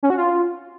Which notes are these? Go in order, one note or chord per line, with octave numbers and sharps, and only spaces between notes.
C#4
F#4
F4